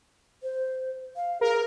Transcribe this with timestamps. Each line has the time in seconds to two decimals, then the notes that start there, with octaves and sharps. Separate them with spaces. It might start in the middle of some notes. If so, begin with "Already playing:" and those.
0.43 C5
1.16 F5
1.41 G#4 A#4